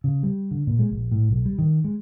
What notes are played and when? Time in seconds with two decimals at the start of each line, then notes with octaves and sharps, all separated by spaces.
0.04 C#3
0.23 G3
0.51 D3
0.67 A#2
0.79 G#3
0.91 A#1
1.12 A2
1.29 B1
1.46 G3
1.59 D#3
1.84 G#3